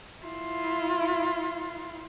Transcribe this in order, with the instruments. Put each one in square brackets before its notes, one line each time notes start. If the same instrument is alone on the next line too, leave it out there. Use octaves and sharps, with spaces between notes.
[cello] E4 F4